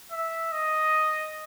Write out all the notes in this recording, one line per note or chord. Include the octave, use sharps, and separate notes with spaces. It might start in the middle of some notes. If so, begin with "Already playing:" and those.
E5
D#5